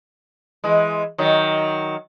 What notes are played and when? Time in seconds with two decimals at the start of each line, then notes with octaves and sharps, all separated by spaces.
0.64 E3 G#3
1.18 D#3 F#3